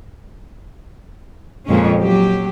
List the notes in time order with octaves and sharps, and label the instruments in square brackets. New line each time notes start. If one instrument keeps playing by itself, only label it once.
[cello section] F2 A#2 G#3 C#4
F#3 G4